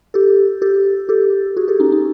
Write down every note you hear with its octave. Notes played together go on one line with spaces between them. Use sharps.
G4 A4
G4 A4
G4 A4
F#4 G#4
G4 A4
C#4 D#4
C#4 D#4